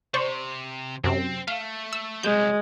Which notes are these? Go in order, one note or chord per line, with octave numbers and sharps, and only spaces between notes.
C3 C5 D5 C#6
F#2 C3 C4
A3 F5
E6
C2 F#3 G#3 G6